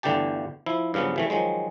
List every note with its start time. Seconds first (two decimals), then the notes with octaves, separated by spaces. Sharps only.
0.03 G1 D2 D3 E3 G4 A5
0.66 F3 E4
0.94 G2 C#3 F3 F#3 B3
1.16 C3 E3 A3
1.30 D#3 F3 F#3 G#3